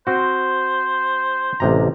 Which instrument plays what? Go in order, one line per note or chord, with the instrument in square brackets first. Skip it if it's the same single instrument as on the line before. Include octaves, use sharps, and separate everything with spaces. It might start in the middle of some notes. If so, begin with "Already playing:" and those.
[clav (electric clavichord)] C4 F#4 [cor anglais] C5
[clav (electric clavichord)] A1 C3 A#5